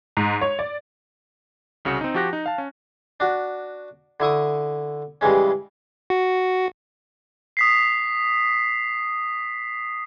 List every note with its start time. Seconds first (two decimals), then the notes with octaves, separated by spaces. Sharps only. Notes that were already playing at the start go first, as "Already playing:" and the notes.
0.17 G#2
0.41 C#5
0.59 D5
1.85 C2 C#3 F#4 C#7
2.01 C4 D#4
2.14 F3 F#4 G4 F#6 A#6
2.33 D#4
2.46 F5 A5
2.58 C#4
3.20 D4 F#4
4.20 D3 E4 C#6 D#6
5.21 G2 C#3 E3 G#3 C#4
6.10 F#4
7.57 D#6 B6 C7